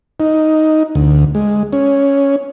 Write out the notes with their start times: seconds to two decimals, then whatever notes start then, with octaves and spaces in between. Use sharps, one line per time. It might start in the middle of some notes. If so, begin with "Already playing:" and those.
0.20 D#4
0.95 D2
1.35 G#3
1.73 C#4